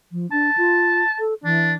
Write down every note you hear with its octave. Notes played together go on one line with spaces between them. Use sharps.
F3
D4 A5
F4
A4
E3 D4